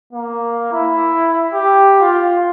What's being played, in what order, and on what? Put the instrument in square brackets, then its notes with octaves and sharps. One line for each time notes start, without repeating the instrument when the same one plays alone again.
[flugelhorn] A#3
E4
G4
F4